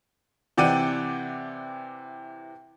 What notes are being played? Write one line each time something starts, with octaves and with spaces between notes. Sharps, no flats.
C3 E3 D5 F#5 G5 D#7